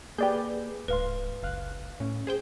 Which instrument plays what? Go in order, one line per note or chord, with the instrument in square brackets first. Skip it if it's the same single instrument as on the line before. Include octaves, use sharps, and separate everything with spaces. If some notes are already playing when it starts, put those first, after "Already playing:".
[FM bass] A#3 [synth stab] G4 D5 G6 [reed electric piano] G#4 B4
[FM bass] D1 [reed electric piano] G#2 F5 C6 [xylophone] B4
[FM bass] F#1 [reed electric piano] C#2 F5 F#6
[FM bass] A2 [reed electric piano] C#4
[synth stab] G#4 C5 G5